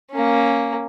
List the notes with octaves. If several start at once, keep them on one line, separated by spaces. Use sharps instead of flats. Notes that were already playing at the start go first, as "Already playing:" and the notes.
A#3 C#4